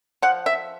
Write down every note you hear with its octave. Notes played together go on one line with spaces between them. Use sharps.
F3 F#5
E5